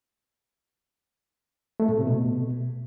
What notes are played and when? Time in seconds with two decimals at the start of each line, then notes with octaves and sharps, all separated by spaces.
1.80 A3
1.89 A2
1.98 C3
2.07 B2